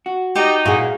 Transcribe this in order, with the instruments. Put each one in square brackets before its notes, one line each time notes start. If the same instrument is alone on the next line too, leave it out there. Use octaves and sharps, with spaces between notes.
[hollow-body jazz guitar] F#4
[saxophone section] D#4 [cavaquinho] G4 D5
[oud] A#2 G#3 [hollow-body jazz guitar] E4 G#4 [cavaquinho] F#4